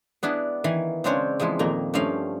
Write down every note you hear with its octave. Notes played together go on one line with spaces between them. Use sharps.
B3 D4 E4 G#4
D#3 E3 F5 G#5
C#3 G#3 C4 D4 C5 C#5
E2 F3 G#3 E4
F2 A#2 D#3 A#3 A#5
G2 F3 A3 C#4 F5 G5